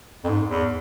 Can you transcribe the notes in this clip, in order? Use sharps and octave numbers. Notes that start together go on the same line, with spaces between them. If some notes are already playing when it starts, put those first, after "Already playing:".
F2
G#2
E2